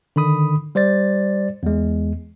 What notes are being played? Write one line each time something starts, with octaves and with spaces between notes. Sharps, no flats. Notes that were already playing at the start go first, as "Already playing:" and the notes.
D3 D#3 B5 D#6
G3 C5 D5 A6
E2 G#3